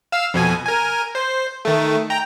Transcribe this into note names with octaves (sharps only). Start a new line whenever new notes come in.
F5 E6
F2 B2 G#5
A#4 G#5
C5
D#3 A3
G5 A#5